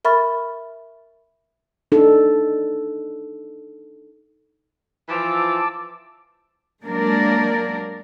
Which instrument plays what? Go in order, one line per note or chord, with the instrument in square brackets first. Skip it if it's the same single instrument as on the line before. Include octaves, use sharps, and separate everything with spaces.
[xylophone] A#4 E5 B5 C#6 F6 A6
[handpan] D4 D#4 A4
[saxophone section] E3 F3 [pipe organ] A5 D6 E6
[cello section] F#3 G#3 A#3 D4 A#4 D5